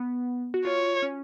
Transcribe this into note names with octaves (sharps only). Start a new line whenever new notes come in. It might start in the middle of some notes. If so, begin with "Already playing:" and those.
Already playing: B3
F#4
F4 C#5
C#4